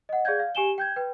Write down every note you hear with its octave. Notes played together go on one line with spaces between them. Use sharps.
D#5 F#5
G#4 D5 F5 G6 G#6
F5
G4 G#5 E7 G7
G5 G6 G#6
B4 G5